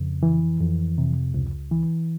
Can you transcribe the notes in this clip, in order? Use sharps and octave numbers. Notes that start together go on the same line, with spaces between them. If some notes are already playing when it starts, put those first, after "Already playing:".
Already playing: F2 C#3
E3
F2
C3
C#2
E3